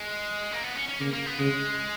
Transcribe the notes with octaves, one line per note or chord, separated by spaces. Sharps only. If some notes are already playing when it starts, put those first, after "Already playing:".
Already playing: G#3
A#3
B3
C#4
C#4
C#3 A#3
A#3
B3
C#3 G#3